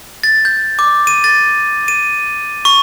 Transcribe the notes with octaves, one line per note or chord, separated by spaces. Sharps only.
A6
G6
D6
D#7
A6
D#7
C#6